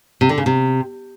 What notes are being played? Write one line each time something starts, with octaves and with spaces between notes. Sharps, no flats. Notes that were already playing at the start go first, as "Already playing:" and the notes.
C3
D3
C#3
C3